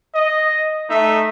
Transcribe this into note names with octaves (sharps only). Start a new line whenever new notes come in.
D#5
A3 D#4 E5